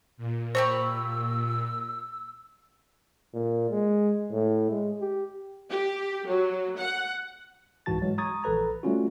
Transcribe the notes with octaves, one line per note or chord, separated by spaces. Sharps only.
A#2
G4 C5 B5 C#6 E6
A#2
G#3
A2
G#3
G4
G4
F#3
F#5
C2 G#2 E3 F#4 A5 A6
E3 F#3 G#3
A#5 C#6 D#6 G#6 A6
A#1 E3 A4 B4 A#5
G3 A3 B3 C#4 F4 F#4